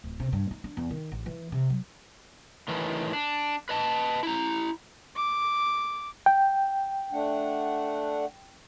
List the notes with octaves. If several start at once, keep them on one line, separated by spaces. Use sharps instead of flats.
D1
C3
G2
D#4
D4
E2
D#3
A1
E3
C3
F#3
A2 D#3 E3
D4
B4 D#5 A5
E4 A#5
D6
G5
A3 D4 F#5